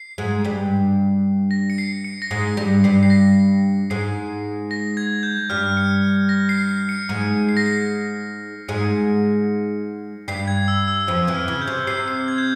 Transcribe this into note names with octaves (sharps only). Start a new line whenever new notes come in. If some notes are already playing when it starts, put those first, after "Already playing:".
Already playing: C7
G#2 G#3
G2 G3
A#6
C#7
C7
C#7
A#6
G#2 G#3 C7
G2 G3 A#6
G2 G3 C7
C7
A#6
G#2 G#3 C7
A#6
G#6
G6
G2 G3 F6
C#7
A#6
C7
C7
C#7
G#2 G#3 C#7
C7
A#6
C7
G#2 G#3 C#7
G2 G3 C7
G#6
E6
E6
F2 F3 E6
E2 E3
F6
C#3
G6
C3
C3 C7
C7
G#6
G6